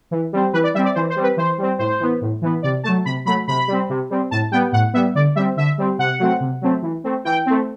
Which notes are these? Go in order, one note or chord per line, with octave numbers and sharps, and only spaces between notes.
E3
G3 C4
E3 B4
D5
G3 C4 E5
D5
E3 C5
C5
G3 C4
B4
E3 C5
G3 C4
A2 C5
E3 B3
A2
E3 B3
C3 D5
F#3 A3 A5
C3 B5
F#3 A3 B5
C3 B5
G3 C4
C3
G3 C4
A2 A5
G3 B3 G5
A2 F#5
G3 B3 E5
D3 D5
G3 C4 E5
D3 E5
G3 C4
C3 F#5
F#3 A3 C4
C3
F#3 A3 C4
E3
A3 C4
E3 G5
A3 C4